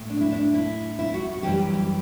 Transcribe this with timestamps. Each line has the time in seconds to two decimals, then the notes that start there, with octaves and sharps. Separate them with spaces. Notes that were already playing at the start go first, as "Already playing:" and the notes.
Already playing: A2 A3
0.10 D4
0.21 E4
0.32 D4
0.54 E4
0.99 E4
1.14 F#4
1.33 F#4
1.43 F#2 E3 G3 G4
1.74 G4